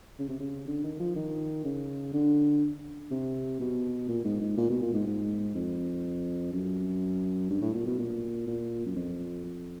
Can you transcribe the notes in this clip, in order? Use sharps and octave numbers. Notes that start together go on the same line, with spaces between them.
C#3
C3
C#3
D3
D#3
F3
D#3
C#3
D3
C3
B2
A#2
G#2
G#2
A#2
B2
A#2
G#2
G#2
F2
F#2
G2
A2
A#2
B2
A#2
A#2
F#2
F2
F2